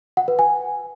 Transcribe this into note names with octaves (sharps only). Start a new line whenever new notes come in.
F#5
B4
G#5